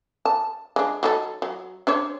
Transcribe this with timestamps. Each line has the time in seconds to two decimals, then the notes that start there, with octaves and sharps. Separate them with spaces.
0.25 A5
0.76 G#3 D4
1.03 F#3 D#4 A4
1.42 F#3
1.87 D4 C5 C#5